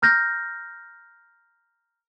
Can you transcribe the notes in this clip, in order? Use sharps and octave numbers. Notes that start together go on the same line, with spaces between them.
A#5 F6 G6 A#6